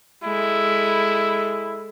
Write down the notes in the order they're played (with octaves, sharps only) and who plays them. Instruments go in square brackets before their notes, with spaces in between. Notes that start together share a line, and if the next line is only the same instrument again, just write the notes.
[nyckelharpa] G#3 A4 [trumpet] E4